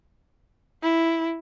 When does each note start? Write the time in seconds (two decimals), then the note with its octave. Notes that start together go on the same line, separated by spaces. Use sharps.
0.82 E4